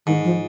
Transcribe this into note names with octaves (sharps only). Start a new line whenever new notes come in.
G#2 D#3
F3